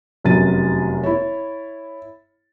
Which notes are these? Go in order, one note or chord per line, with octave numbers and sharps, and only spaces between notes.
F1 F#2 F#3 A6 D#7
E4 C#5